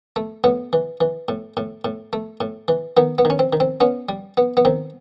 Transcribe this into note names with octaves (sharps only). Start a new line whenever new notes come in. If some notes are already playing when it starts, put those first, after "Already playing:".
A3
A2 B3
E3
E3
A2
A2
A2
A3
A2
E3
D#3 B3
B3
D#3
C#4
C4
D#3
C4
B3 C#4
G3
B3
B3
D#3 C4